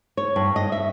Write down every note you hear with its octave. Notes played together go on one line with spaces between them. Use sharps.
C#5
G2
D#5
E5